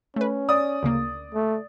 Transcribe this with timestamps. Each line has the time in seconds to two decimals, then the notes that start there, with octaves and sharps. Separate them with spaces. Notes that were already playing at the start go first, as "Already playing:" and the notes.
0.16 A3 C#4 B4
0.49 D5 D#6
0.83 D2 C#3 A#3
1.34 A3